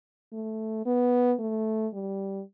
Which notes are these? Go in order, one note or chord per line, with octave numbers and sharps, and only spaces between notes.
A3
B3
A3
G3